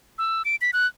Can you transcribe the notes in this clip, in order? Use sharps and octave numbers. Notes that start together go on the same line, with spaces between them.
E6
D7
B6
F#6